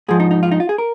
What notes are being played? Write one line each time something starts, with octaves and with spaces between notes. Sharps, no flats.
G#2 F3 G#4
D#4
D#4
F4
D#4
F4
G#4
A#4